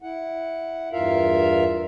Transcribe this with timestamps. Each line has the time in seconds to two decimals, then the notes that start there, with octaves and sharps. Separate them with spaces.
0.02 E4 F#5
0.92 E2 G2 F4 A#4 E5 F5